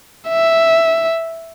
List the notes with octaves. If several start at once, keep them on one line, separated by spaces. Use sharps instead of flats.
E5